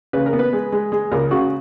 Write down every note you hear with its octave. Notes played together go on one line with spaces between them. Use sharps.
C#3 B4
A#4
B3
B4
G#3
G#3
G#3
C#2 A#4
C#3 F#4